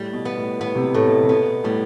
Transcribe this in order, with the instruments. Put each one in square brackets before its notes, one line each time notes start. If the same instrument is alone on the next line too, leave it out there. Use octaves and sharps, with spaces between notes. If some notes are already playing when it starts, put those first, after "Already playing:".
Already playing: [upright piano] A2 [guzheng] G3
[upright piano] B2
[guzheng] B3
[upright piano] A2
[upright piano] A2 [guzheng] B3
[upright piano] C3
B2
[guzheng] A2
[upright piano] B2
C3
[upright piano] B2 [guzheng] B3
[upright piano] A2 [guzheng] G3